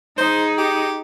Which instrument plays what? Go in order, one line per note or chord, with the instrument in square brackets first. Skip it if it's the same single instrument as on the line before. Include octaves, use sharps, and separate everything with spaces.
[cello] D#4 G#4 [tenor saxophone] C5
[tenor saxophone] G4